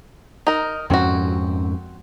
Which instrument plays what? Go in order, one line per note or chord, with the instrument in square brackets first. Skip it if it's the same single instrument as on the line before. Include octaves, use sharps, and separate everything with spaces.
[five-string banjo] D#4 A#4
[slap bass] F2 G#2 C#4 [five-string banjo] C4 F#4